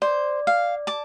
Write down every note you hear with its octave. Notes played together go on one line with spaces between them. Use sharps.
C5 D5
F5
A5 D6